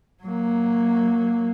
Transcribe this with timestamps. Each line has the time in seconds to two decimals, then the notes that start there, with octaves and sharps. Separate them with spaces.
0.23 F#3 A#3